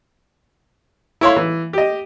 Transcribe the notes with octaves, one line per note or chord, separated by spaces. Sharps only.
E4 C#5 F5 C6
E3
G4 D#5